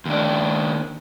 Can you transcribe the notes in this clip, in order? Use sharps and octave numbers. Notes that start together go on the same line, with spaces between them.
D#2 D4